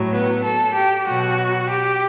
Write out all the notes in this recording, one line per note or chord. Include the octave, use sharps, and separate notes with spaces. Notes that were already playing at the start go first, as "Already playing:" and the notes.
Already playing: A2 F#3
B3
A4
G4
B2 F#3 F#4
G4